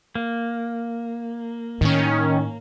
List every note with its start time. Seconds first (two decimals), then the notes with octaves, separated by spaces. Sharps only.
0.15 A#3
1.81 A2 D#3 C#4